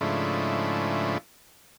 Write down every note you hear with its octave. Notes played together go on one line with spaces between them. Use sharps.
G#2 C#3 F3 A3 D4 E4